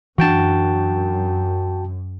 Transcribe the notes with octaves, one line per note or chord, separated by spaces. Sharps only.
F#2 E3 D4 F#4 G5 A5